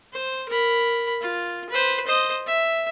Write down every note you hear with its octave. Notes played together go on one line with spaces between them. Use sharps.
C5
A#4 B5
F4
B4 C5
C5 D#5
E5